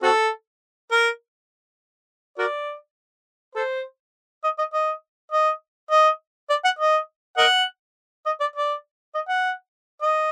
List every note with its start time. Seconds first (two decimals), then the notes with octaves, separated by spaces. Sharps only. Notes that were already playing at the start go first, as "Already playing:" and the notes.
0.02 C4 F#4 A4
0.92 A#4
2.38 F#4 A#4 D5
3.55 A4 C5
4.44 D#5
4.58 D#5
4.73 D#5
5.32 D#5
5.91 D#5
6.50 D5
6.65 F#5
6.79 D#5
7.37 A#4 D#5 F#5
8.26 D#5
8.40 D5
8.56 D5
9.14 D#5
9.28 F#5
10.02 D#5